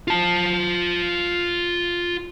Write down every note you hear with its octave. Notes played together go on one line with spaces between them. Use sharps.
F4 A5